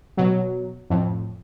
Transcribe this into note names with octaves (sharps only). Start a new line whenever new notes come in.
B2 F#3
F2 A2